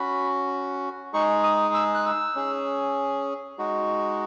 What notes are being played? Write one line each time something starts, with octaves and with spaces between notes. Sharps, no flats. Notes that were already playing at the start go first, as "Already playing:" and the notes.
Already playing: C#4 F#4 B5
G#3 D#4 G#4 C#6
D#6
E6
F#6
E6
C#4 G#4
G#3 D#4 F#4